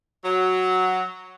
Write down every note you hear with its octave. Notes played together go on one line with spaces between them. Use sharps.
F#3